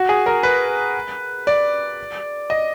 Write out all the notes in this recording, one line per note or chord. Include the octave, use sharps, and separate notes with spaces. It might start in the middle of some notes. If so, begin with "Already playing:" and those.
Already playing: F#4
G#4
A#4
B4
D5
D#5